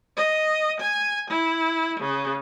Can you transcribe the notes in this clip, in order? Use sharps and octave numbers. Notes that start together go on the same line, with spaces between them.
D#5
G#5
E4
C#3